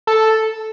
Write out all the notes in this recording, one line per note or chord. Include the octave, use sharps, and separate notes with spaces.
A4